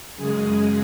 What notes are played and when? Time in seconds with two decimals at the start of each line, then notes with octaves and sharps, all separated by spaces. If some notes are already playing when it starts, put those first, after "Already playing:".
0.16 F#2 C#3 G#3 G#4